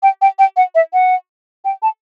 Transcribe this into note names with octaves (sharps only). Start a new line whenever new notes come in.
G5
G5
G5
F#5
E5
F#5
G5
A5